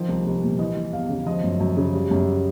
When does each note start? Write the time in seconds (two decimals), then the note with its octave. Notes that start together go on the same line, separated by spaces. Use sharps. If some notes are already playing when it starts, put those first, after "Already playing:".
Already playing: D#3 F3
0.08 C2
0.26 C2
0.43 A#2
0.59 E3 D#5
0.76 G3
0.93 E2 F5
1.10 C#3
1.26 F3 D#5
1.44 F#2
1.60 F#2
1.77 C#3
1.94 G3
2.11 F#2